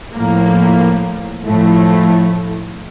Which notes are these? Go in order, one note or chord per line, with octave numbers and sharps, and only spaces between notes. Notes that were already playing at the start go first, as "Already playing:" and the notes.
A2 F3 A#3
A2 F3 A3